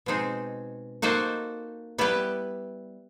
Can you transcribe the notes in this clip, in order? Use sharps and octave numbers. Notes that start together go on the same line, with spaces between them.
B2 G#3 C4 D#4
A#3 D#4 F#4 A4 C5
G3 B3 E4 G4 B4